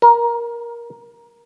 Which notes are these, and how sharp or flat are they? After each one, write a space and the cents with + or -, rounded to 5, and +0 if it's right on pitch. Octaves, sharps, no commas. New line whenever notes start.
A#4 +15